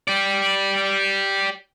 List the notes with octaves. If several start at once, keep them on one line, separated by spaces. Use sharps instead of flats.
G4 D5